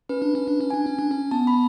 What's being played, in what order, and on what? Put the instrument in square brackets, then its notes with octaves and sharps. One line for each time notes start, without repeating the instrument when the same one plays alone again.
[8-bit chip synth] C#4 [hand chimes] B4
[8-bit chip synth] D4
C#4
D4
C#4
[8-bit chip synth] D4 [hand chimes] G#5
[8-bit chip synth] C#4
D4
C#4
[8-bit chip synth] B3 [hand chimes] A5
[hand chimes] B5